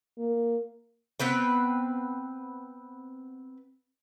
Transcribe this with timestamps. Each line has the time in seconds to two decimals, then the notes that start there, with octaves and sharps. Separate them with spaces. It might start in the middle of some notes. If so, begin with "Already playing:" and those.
0.18 A#3
1.20 B3 C4 B4 G5